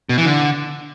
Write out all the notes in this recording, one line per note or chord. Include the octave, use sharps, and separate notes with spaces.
B2
E3
D3